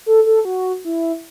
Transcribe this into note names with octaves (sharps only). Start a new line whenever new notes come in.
A4
A4
F#4
E4